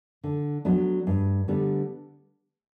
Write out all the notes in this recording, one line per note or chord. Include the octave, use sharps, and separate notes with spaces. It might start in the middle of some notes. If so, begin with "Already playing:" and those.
D3
F#3 B3 D4
G2
D3 G3 B3